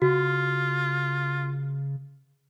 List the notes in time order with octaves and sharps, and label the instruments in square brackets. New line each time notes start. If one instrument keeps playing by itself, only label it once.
[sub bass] C#3 [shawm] F4 [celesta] F#4